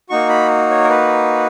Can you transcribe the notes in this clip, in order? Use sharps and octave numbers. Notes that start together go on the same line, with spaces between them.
A#3 D#4 F#4 C#6
B5
C#5
A#4
B4